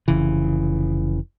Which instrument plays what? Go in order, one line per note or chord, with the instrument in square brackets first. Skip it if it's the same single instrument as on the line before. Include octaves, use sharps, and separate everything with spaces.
[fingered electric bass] F1 C#3 E3